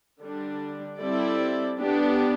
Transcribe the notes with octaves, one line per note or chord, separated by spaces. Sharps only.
D3 G3 D4
G3 C4 E4 A4 D5
B3 D4 G4